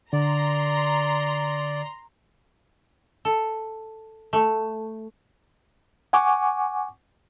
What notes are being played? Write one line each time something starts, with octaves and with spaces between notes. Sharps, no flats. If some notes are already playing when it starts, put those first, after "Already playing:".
D3 D5 A#5 C6
A4
A3
F#5 G#5 C#6 D6